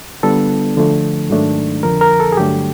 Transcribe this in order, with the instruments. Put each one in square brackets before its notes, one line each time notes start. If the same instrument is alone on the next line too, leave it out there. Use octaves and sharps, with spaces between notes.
[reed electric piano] D3 G3 B3 D4 F4 A4
D3 F3 A3
G#2 D#3 F#3 A3 D4
F2 D3 F3 A#4
A#4
A4
G#4
G2 D3 F#3 A3 G4